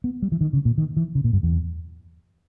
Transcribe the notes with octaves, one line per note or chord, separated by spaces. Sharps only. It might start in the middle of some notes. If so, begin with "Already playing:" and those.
B3
G3
E3
D#3
C#3
A#2
D#3
E3
C#3
A#2
G2
E2